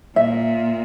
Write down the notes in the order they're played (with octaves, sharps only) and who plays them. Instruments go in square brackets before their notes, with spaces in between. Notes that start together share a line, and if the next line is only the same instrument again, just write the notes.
[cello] A#2 [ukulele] E5